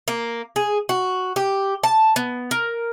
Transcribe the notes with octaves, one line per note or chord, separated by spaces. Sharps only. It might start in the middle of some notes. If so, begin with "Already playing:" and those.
A#3
G#4
F#4
G4
A5
B3
A#4